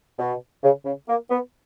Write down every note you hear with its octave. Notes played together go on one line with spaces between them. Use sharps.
B2
C#3
C#3
A#3
B3